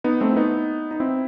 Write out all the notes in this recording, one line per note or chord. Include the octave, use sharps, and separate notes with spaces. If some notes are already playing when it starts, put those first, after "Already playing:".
B3 D#4
A3 C4
E4
B3 D#4
D#4
C4 E4